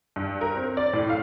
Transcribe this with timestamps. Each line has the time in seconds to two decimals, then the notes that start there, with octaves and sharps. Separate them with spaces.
0.16 G2
0.41 A#4
0.56 C4
0.77 D5
0.93 A2
1.10 F5